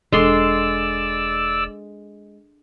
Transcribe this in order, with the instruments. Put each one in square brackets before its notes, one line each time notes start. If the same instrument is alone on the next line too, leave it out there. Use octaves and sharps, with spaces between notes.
[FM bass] E1 [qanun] G#3 C6 [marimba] D4 A4 [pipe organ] D5 E6